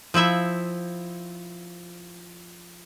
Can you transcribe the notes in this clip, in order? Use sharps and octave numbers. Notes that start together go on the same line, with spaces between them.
F3 C4 E4 E5